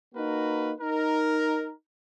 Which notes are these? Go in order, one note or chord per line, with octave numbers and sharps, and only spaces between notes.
A#3 D#4 F#4 A#4 B4
D#4 A#4